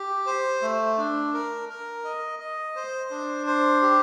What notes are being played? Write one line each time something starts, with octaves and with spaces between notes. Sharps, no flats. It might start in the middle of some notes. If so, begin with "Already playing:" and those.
Already playing: G4
C5
A3
D4
A#4
A#4
D#5
D#5
C5
D4
C5
G4